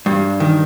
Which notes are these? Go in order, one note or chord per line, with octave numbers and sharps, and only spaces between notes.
G2
D#3